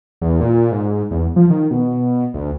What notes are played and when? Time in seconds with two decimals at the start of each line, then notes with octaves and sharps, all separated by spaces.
0.22 E2
0.41 A#2
0.71 G#2
1.11 E2
1.36 F3
1.50 D#3
1.71 B2
2.34 D2